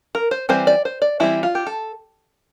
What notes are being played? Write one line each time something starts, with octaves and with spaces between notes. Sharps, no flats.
A#4
C5
E3 G3 C4 C5
D5
C5
D5
E3 G3 C4 E4
F4
G4
A4